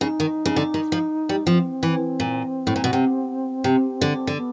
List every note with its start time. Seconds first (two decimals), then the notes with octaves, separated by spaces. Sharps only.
0.01 C#3 D#4
0.20 D#3
0.45 C#3
0.56 D3
0.74 D#3
0.92 F3
1.29 G3
1.46 F3 C4
1.83 E3
2.20 A#2
2.67 A2
2.76 A#2
2.84 B2
2.93 C3
3.64 C3
4.01 D3
4.27 D3
4.37 B3